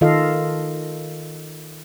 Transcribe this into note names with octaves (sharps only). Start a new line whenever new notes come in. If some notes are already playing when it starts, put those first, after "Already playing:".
D#3 F4 A4 D#5 F5